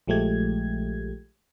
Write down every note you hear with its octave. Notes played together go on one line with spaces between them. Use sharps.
A#1 F3 G#3 A3 G4 G#6